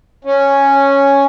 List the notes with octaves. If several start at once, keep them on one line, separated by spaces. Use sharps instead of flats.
C#4